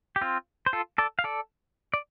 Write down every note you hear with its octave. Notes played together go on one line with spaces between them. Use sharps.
G4
C4 F4
C5
F4 A4
A4 D5
F5
A4 D5
D5